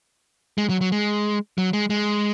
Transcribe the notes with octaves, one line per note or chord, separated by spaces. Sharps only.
G#3
F#3
F#3
G#3
F#3
G#3
G#3